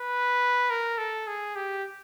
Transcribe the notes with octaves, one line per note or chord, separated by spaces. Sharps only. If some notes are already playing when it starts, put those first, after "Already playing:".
Already playing: B4
A#4
A4
G#4
G4